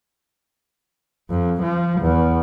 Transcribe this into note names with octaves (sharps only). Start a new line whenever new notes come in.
F2
F3
E2